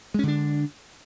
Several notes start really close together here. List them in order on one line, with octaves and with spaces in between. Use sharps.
G#3 C#4 D3 D4